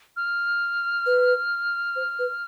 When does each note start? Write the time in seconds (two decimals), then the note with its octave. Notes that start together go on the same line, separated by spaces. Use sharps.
0.16 F6
1.06 B4
1.96 C5
2.19 B4